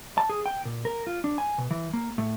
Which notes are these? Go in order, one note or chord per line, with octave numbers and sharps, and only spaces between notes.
A5
G#4
G5
A#2
A#4
F4
D4
G#5
B2
E3
A#3
A2